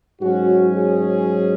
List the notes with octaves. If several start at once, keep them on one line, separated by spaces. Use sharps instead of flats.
G#2 F#3 C#4 F#4
G#4